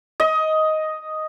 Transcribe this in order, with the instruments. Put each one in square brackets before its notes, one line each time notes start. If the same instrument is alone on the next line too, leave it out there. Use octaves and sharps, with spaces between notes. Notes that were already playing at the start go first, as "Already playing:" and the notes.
[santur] D#5